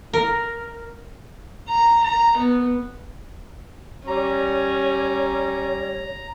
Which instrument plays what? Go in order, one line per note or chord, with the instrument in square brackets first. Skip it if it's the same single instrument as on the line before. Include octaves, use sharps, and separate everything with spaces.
[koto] A#4
[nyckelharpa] A#5
A#5
B3
[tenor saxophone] G3 [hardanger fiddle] C#4 [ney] C#5 [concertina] A#5